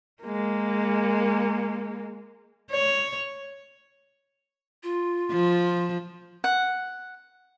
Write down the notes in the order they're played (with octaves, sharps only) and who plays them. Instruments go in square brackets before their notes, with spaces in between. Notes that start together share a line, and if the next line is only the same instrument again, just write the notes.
[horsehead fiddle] G#3 A#3
[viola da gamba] C#5
[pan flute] F4
[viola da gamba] F3
[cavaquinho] F#5